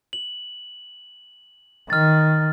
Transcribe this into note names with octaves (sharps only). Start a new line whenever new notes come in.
F#7
D#3 F6 A6